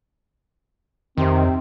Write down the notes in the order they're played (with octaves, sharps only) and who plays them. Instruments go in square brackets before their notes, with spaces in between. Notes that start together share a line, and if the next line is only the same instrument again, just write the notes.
[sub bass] F2 [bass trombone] C3 [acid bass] D#3 [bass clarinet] C4